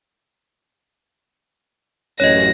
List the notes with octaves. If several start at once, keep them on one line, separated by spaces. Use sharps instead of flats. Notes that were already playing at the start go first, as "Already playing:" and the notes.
A1 F#2 C#5 D#5 A#6